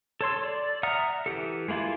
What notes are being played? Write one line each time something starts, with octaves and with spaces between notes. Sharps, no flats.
A4 C#5 C6 E6
D5
E5 F#5 A#5 D#6 F6
E3 G4 A4
G#3 A#3 E4 F4 G#4